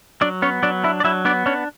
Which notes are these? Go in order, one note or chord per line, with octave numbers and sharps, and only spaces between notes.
F#3 D4 D5
B3 C#4 C#5
F#3 D4 D5
D4 E4 E5
D5
F#3 E4 E5
B3 D4 D5
C#4 D4 C#5